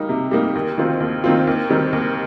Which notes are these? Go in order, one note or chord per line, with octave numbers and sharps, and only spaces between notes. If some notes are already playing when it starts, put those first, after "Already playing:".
Already playing: G3 A#3 D#4
C3
G3 A#3 D#4
D#2
D#3 C4 F4
D#2
D#3 C4 F4
D#2
D#3 G3 C4
D#2